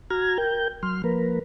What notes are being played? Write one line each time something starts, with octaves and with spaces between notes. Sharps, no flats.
F#4 A#5 F6 G#6
A#4 G5 G6
F#3 C6 F6
F3 A#3 A#4 B4